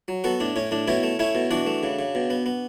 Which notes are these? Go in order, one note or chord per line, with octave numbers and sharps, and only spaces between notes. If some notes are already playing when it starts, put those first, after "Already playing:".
F#3
B3 F#4 A4
A2 D4
A2 C#4
A2 D4
B2 C#4 E4
A3
A3 C#4 E4
B2
E3 D4 F#4
A3
C#3
C#3
B2
B3
B3